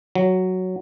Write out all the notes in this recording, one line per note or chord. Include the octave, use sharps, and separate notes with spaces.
F#3